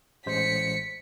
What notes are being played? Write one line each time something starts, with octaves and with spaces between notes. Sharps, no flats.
A1 G#3 C5 B6 C#7